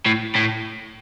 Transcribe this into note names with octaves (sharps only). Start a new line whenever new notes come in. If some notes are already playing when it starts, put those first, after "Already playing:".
A2
A2